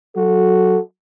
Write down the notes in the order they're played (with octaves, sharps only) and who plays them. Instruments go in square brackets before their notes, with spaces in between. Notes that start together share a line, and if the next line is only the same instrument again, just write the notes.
[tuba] F#3 [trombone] F#4 [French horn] A4